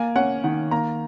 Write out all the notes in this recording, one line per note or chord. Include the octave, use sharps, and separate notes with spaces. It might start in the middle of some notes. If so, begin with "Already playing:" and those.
Already playing: A#3 G#5
C#4 F#5
D#3 F#5
A#3 A#5